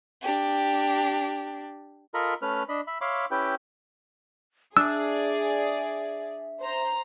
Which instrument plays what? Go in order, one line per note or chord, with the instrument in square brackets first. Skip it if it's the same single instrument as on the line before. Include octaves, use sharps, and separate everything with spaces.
[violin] D4 G4
[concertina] F4 A4 A#4 D#5 A#5 B5
A3 C#4 B4 F6
D4 D#5 B5
E5 B5
C#5 E5 F5 B5 C6 D6
C#4 E4 G4 B4 G5
[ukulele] D4 [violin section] G#4 D5 [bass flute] E5 [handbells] E6
[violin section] C5 A#5